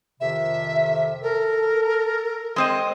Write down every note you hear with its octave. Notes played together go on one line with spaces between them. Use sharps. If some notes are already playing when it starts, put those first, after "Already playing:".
F2 C3 D#3 E5
A4 A#4
G#3 C4 D#5